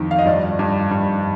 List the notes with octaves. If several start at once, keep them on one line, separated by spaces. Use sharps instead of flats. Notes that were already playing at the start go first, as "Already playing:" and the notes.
Already playing: F2 D#3
F5
D#5
G2 D5
G2
G2